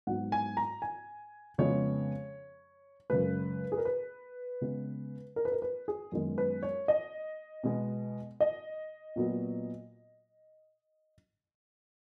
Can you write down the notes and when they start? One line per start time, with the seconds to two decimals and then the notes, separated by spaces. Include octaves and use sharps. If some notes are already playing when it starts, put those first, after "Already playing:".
0.07 G#2 F#3 B3 F#5
0.32 G#5
0.57 A#5
0.82 G#5
1.58 F2 C#3 G#3 B3 C#5
3.10 F#2 C#3 G#3 B4
3.72 G#4
3.78 A#4
3.85 B4
4.61 C#3 G#3 B3
5.36 A#4
5.45 B4
5.52 A#4
5.62 B4
5.88 G#4
6.12 F#2 D#3 G#3 B3
6.38 B4
6.63 C#5
6.88 D#5
7.64 B2 G#3 B3
8.41 D#5
9.16 A#2 F#3 B3